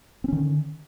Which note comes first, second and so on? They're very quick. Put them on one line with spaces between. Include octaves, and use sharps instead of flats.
C4 C#4 D#3 D3